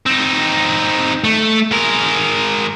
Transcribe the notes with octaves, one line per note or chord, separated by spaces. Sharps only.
C4 D#4
A3
G#3 A#4